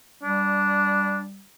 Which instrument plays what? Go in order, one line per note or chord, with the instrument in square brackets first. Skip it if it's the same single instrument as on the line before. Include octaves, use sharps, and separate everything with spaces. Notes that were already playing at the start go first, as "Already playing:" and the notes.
[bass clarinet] G3 [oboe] D4